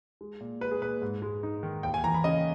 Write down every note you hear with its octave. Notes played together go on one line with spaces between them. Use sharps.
G#3
A#2
G#3 B4
G#4
A#2 B4
G#2
G#3
D#4
D#3
D#2 G5
G#5
E3 A#5
B5
C#3 D#5